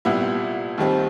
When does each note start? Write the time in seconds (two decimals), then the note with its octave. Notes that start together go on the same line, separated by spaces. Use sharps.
0.05 C2 A#2 G3 B3 E4
0.78 D#2 D#3 G3 C4